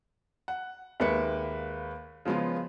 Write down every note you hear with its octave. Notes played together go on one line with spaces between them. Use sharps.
F#5
D#2 G#3 A#3 B4 E5 C#7
C#3 F3 G#3 B3 F4